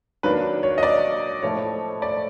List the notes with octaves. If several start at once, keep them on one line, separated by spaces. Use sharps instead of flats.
D#3 F#3 A#3 D4 B4
C#5
D#5
D5
A2 F3 A3 C#5
D5